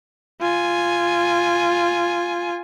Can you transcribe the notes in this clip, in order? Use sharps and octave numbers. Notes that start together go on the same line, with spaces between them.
F4 G#5